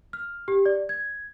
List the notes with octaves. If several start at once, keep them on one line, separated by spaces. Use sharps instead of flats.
F6
G4
D5
G#6